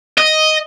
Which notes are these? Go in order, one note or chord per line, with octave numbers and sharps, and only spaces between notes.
D#5